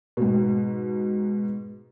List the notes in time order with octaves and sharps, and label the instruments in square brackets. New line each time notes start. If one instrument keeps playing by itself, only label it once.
[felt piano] G#2 B2